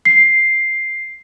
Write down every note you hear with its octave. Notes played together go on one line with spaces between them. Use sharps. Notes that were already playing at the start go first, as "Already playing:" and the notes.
C7